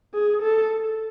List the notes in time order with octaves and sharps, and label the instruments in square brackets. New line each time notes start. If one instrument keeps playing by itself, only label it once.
[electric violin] G#4
A4